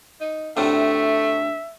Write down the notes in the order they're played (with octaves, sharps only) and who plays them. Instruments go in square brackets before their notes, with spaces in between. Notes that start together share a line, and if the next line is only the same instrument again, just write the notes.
[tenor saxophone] D#4
[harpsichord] D2 A2 C3 [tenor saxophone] A3 [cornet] E5